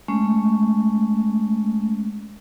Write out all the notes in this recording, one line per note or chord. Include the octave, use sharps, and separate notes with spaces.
G#3 A3 C#4